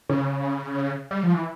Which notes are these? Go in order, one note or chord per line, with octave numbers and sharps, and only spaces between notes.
C#3
G3
F3
E3